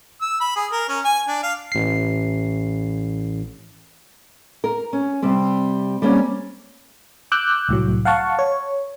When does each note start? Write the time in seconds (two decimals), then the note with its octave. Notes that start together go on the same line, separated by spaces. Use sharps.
0.21 E6
0.41 B5
0.56 G#4
0.72 A#4
0.89 C#4
1.04 G#5
1.28 D4
1.43 F5
1.72 A1 C7
4.64 A#4
4.93 C#4
5.22 C3 G3 C4
6.02 G3 A#3 C4 C#4
7.32 D6 E6 F#6 G6
7.69 C2 A2 F#3
8.05 F5 F#5 A5 C#6
8.39 C#5